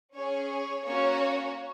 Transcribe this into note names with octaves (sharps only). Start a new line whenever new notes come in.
C#4 G#4 C#5
C#5
A#3 C#4 F#4 C#5